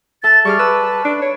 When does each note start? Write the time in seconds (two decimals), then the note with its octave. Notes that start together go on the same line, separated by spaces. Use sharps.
0.24 A4 E5 A5 A6
0.45 G3 G#4 C#6 D6 F6
0.59 B4 A5 E6
1.05 D4
1.22 C#5